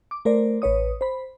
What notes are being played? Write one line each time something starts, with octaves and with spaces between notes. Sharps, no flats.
D6
A3 A#4 C5 D5
A1 B4 C#5 D#6
C5 B5